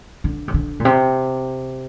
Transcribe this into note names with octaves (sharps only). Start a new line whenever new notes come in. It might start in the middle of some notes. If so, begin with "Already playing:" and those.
D3
C3
D3
A#2
C3